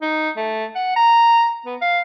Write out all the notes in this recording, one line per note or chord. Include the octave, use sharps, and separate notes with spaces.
D#4
A3
F#5
A#5
B3
F5